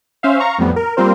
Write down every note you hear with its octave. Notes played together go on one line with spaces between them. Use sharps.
C#4 C5 E5 F5
F5 A#5 C#6
F2 A2 F3 G3 B3
A#4
G3 A#3 C4 F4 A#4 C5